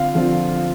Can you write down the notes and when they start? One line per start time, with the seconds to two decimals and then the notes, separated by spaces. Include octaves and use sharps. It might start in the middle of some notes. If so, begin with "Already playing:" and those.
Already playing: D3 C4 F4 F5
0.15 D3 F3 C4 F4